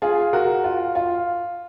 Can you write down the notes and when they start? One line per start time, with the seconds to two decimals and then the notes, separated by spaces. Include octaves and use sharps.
0.02 F4 G#4
0.33 F#4 A#4
0.64 F4
0.95 F4